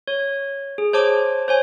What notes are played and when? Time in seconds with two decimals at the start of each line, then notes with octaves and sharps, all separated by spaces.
0.08 C#5
0.78 G#4
0.93 C5 C#5 A5 D6
1.48 C5 C#5 G#5